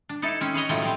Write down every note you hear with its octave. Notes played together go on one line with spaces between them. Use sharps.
D4
D#4 E4 A4 A5
C4 C#4
G#4 B4 C#5 D#5
A2 F3 F#3 A3 G5
G3 C4